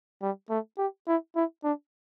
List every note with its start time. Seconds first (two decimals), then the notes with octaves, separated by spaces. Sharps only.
0.22 G3
0.50 A3
0.78 G4
1.08 E4
1.36 E4
1.64 D4